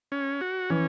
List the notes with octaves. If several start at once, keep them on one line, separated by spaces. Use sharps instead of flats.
C#4
F#4
E3 C#4